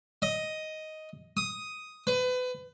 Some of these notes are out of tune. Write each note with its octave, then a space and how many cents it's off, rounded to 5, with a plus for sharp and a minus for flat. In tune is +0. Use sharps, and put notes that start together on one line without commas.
D#5 +5
D#6 +5
B4 +30